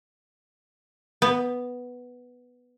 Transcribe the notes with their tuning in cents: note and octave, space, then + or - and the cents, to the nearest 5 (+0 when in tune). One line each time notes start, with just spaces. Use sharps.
B3 +0